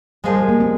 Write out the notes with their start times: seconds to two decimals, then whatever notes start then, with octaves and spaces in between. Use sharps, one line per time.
0.24 A#2 F3 G3 G#3 D#4 G#4
0.36 G3
0.49 A#3
0.60 C4